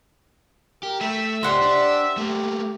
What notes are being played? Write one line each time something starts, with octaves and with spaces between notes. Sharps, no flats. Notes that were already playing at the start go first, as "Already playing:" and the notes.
G4 A#4
A3 E5 G5
C#2 D#4 G4 C5 D5 F#5 C6
D4
A3 A#3 G4